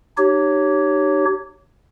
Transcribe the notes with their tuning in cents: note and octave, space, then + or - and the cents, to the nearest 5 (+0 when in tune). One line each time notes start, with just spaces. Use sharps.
D#4 -40 G4 -25 C#5 +0